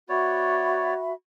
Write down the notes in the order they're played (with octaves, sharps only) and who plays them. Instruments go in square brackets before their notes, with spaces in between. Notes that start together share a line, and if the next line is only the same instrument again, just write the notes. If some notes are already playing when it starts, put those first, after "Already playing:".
[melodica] B3 C#5 D5 [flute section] F#4 E5 B5